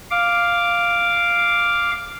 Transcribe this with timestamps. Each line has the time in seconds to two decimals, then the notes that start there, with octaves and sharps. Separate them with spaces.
0.11 F5 D6